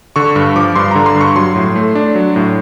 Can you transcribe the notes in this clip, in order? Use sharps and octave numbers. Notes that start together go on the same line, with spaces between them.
D3 C#6
G2 C#6
F3 D6
G2 C6
D3 A#5
C6
G2 C#6
F#3 C6
A2
A3
D4
F#3
A2